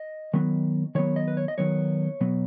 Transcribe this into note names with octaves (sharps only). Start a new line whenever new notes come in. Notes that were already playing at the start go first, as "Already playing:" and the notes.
Already playing: D#5
D#3 F#3 B3
D#3 F#3 B3 C#5
D#5
B4
C#5
D#5
D#3 F#3 B3 C#5
B2 F#3 B3